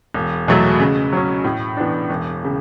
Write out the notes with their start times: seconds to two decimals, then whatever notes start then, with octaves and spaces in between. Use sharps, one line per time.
0.14 E1
0.48 E2 B2 F#3 A3
0.80 C#3
1.13 F#3 C#4
1.44 A2
1.77 E3 B3 D4
2.10 E1
2.45 C#3